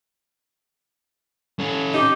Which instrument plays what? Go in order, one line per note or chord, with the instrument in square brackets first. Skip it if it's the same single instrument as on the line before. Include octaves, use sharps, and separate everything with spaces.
[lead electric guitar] C#4 A4
[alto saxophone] D#4 [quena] G4